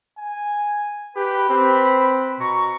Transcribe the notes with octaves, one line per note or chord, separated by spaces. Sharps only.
G#5
G4 B4 B5
C4
B2 A#5 C#6